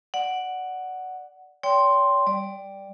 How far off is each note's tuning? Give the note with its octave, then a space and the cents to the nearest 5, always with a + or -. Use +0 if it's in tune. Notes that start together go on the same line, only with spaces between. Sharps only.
D5 +0 F#5 +0
C#5 +45 G5 +0 C6 +0
G3 +0 D5 +0